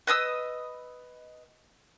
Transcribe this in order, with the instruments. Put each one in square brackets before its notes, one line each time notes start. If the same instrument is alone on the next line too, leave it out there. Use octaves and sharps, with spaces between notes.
[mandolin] B4 D#5 D#6 E6